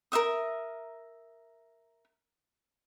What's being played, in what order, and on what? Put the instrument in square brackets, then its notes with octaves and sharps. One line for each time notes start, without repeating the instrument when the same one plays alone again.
[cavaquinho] A#4 C5 E5 D#6